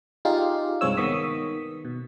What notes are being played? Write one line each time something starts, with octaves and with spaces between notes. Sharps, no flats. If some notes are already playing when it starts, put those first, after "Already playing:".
D#4 F4 G4 G#4 D5 F5
C2 G2 G#3 C4 C#5 E6
D#3 B3 C#6 D#6 B6
B2